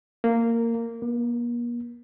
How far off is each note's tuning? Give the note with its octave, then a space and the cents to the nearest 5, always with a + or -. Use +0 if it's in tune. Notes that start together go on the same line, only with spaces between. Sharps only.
A#3 -15
A#3 +40